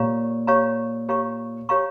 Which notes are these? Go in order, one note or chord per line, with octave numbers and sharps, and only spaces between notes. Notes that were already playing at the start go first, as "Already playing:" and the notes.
Already playing: A#2 G4 C#5 F5 A#5 C#6
G4 C#5 F5 A#5 C#6
G4 C#5 F5 A#5 C#6
G4 C#5 F5 A#5 C#6